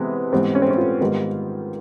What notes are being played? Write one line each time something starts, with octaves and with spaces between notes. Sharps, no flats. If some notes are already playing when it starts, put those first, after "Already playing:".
Already playing: C3 E3 G#3 B3
G#2 E3 G3 B3 C4
C#4
C4
C#4
F4
G#2 D#3 G3 B3